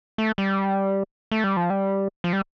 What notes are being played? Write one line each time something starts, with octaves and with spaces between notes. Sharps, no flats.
A3
G3
A3
G3
F3
G3
F3
G3